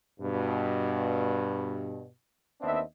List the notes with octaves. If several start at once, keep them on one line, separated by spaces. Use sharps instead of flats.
G2 B2
D#2 B3 C4 D4 D#5 E5